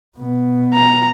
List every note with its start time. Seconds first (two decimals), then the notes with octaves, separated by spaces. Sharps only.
0.17 B2 B3
0.74 A#5